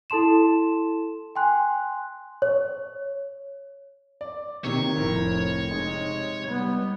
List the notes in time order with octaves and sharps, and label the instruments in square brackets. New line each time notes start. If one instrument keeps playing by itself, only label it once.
[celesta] E4 A4 A5 C6 E7
G5 G#5 C6 F#6
C#5
[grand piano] D5
[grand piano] C3 D#3 A#3 [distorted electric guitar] C#5
[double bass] F1 [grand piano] A2 C4 A#4
[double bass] C3 [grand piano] G#3 D#4
[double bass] G3 B3